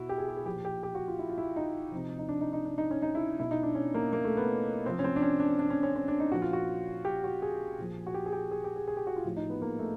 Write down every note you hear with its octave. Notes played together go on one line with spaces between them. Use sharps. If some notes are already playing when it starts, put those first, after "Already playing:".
Already playing: B2 E4 F#4
G4
G#4
G4
G#4
A#2 F3 G4
G4
G4
F#4
F4
E4
F4
E4
D#4
C3 F3
D#4
D4
D#4
D#4
D4
D#4
C#4
D#4
E4
B2 E4
D#4
D4
C#4
A#3
A#3
A3
B3
C3 F3 C4
C#4
C4
D4
C#4
D4
D4
C#4
C#4
C#4
D4
D#4
A#2 F3 F#4
F4
F#4
G4
F#4
G#4
A#2 F3
F#4
G4
G#4
G4
G#4
G4
G#4
G#4
G4
F#4
F4
A2 F3
D#4
B3
A#3
A3